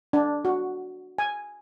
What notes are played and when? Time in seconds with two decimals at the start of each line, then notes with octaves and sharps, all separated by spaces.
0.13 D4
0.45 F#4
1.18 G#5